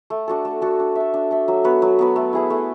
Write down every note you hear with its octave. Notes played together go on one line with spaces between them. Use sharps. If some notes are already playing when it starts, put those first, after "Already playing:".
A3
D4 F#4 A4
A3
D4 F#4 A4
D4
A4 E5
D4
A4 E5
F#3
B3 F#4 B4
F#3
B3 F#4 B4
A3
E4 G#4 B4
A3